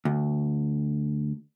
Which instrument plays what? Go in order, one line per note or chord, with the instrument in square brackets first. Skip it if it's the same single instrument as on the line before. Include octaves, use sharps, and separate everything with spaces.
[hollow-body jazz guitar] D2